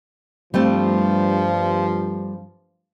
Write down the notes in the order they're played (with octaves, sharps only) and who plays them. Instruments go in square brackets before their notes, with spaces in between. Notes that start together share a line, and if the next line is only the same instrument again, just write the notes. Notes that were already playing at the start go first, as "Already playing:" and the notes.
[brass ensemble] G2 F3 [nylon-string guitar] G3 A3 C4